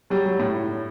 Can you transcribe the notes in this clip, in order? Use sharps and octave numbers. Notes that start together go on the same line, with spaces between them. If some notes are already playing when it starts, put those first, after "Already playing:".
F#3 G3
F#3
A2